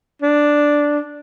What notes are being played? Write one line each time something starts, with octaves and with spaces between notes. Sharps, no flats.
D4